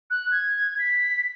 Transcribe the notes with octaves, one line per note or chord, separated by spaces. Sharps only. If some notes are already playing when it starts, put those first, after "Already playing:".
F#6
G#6
B6